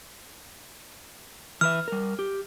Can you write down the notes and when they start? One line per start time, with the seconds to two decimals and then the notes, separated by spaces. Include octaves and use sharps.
1.61 E3 B4 E5 F6
1.88 G3 A#4
2.19 G4